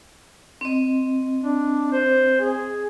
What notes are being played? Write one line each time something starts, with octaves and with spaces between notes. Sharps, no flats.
C4 D#5
D4
C5
G#4